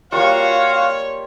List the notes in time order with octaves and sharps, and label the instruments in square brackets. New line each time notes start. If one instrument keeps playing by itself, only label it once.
[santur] G3 A#3 F4 [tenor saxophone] F#4 [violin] C#5 [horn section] F5